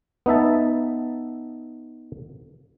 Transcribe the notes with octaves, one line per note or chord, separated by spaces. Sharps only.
B3 D#4 E5 A5